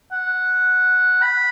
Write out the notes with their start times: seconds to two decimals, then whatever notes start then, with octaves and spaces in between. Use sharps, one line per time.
0.12 F#5
1.22 B5